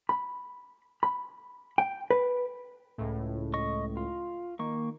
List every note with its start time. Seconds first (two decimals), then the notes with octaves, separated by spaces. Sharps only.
0.09 B5
1.03 B5
1.78 G5
2.10 B4
2.98 C#2 A2
3.54 D#5 C#6
3.97 F4
4.59 D#3 A#3 C#6